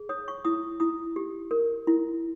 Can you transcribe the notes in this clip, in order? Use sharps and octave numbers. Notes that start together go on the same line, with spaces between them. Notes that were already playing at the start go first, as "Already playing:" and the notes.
Already playing: G#4
C#5 D#6
C#6
E4 D#6
E4 D#6
G4
A#4
E4